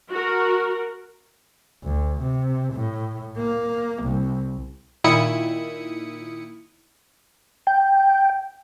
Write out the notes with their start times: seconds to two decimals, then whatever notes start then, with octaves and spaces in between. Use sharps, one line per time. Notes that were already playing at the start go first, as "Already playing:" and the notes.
0.10 F#4 A#4
1.84 D2
2.22 C3
2.74 A2
3.38 A#3
4.04 C2
5.04 A#2 D#3 E4 D#6 C#7
7.67 G5